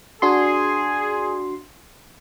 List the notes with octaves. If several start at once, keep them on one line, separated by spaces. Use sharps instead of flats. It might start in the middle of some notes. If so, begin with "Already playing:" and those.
D4 F#4 G#4 C6